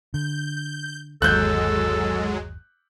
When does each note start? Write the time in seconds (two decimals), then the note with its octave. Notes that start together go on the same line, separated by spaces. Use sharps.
0.14 D3 G6
1.22 G1 D#2 F#3 G#3 A4 F#6 G6